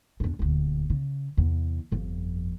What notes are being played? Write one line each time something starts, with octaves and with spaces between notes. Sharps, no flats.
E2 D4
D#1 D2
C#3
E2 C3
G1 F2